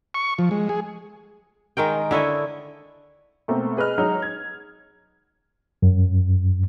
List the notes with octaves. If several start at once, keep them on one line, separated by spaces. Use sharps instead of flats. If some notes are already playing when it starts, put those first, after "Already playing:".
C#6
F3
G#3
G#4
D#3 G#3 A#4 G5
D3 E4 C#5 D#5
B2 A3 A#3 C4
G#4 B4 D#5 F6
F#3 G#3 D#4
G#6
F#2